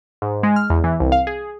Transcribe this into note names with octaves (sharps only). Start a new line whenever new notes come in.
G#2
G#3
F6
E2
E3
C2
F5
G#4